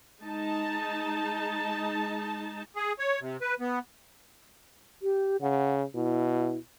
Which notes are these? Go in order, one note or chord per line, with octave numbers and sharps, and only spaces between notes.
G#3 D#4 A5
G#4
C#5
C3
B4
B3
G4
C#3 F#5
B2 E4